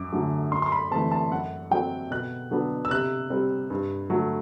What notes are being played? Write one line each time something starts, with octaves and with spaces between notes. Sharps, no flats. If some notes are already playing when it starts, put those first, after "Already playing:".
Already playing: F#2 D6
D3 F#3 A3
F#2 C6
C6
B5
E3 A3 C4 A5
A5
F#2 F#5
F#3 C4 G5
B2 F#6
F#3 B3 D4
E6
C3 F#6
G3 C4
G2
F#3 A3